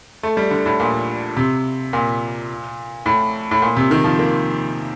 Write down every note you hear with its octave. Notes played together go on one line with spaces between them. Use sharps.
A3
G3
D3
A2
A#2
C3
A#2
A2
A2
A#2
C3
D#3
F3
A#3